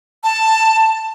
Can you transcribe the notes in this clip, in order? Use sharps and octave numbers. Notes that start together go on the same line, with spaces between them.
A5